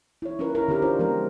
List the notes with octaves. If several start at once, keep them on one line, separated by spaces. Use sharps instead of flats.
E4 C#5
C#4 E4 F4 A#4 B4
E4 A#4
D3 C4 G4 A#4
D4 F4 C5
F3 G#3 B3 A#4